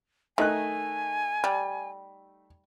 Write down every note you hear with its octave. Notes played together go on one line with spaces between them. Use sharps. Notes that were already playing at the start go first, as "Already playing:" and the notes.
D#3 A3 D#4 G#5 F#6
G3